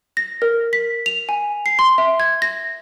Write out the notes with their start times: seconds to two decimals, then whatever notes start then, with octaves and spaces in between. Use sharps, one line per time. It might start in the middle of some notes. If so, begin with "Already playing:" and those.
0.17 A#6
0.42 A#4
0.73 B6
1.06 F7
1.29 G#5
1.66 C7
1.79 C6
1.98 E5
2.20 G#6
2.42 A#6